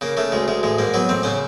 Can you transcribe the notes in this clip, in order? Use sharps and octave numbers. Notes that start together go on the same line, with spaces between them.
C#3 A#3
C#3 A3
D2 G#3
D2 G#3
A1 G#3
G#2 A#3
F#3 B3
A1 C4
C#3 C#4